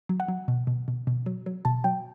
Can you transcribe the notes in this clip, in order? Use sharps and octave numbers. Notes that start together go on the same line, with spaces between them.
F#3
F#5
F#3
B2
B2
B2
B2
F#3
F#3
B2 A5
F#3 G5